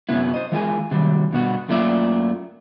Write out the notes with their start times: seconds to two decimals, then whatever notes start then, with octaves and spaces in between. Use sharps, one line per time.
0.09 F#2 C3 F#3 B3 E4
0.34 C5 D#5
0.52 E3 G#3 F4 A#4 E5 G#5
0.91 C3 D#3 F#3 G3
1.33 G2 B2 B3 F#4
1.69 F#2 A3 A#3 F4 D5 E5